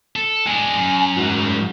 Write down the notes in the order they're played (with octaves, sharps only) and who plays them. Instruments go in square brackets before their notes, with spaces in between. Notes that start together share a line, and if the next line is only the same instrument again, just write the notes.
[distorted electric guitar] A4
[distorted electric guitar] G#3 D4 [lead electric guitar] G#5
[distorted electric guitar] F#2
[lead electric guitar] G#2 F#4